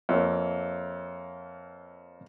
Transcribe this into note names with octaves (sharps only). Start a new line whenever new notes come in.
F2 A#3 C#5 E5